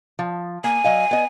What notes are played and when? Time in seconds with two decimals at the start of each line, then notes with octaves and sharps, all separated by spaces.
0.19 F3
0.64 A#3 G#5
0.84 F#3 D#5 F5
1.11 B3 D#5